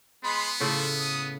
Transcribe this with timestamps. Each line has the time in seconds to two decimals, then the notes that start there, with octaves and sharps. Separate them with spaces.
0.24 G#3 B3 B5 C6
0.60 A2 C#3 F3 A4
0.99 D#6